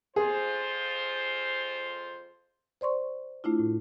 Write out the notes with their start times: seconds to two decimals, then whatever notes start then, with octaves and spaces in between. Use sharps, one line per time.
0.16 F2 F4 G#4 C5
2.81 C5 D5 C6 C#6
3.44 A3 D4 E4 F4
3.59 A2